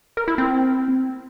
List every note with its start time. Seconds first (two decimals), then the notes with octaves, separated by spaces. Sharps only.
0.17 A#4
0.28 E4
0.38 C4